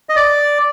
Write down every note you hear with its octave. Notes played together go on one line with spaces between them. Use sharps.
D#5
D5